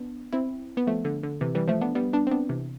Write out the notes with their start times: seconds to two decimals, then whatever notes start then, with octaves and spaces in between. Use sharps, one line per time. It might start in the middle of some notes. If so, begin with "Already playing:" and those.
Already playing: B3 D4
0.33 C4 E4
0.77 B3
0.87 F3 A3
1.05 D3
1.23 D3
1.41 C3 E3
1.55 E3 G3
1.68 F3 A3
1.81 B3 D4
1.95 G3 B3
2.13 B3 D4
2.27 C4
2.31 B3 D4
2.49 C3 E3